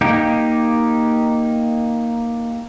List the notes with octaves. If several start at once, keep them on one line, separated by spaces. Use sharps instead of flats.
A#3 D#4 G4